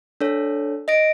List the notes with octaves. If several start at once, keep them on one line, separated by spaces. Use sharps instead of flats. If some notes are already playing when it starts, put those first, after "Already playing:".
D4 A4 C#5
D#5 A#6 D7